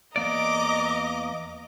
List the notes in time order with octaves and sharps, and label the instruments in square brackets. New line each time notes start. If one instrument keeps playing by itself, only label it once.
[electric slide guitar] E2 A#3 D5 [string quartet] D#5 A#5 D6